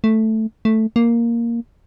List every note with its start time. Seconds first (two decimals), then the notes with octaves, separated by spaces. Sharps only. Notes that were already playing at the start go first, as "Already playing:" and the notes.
0.04 A3
0.65 A3
0.96 A#3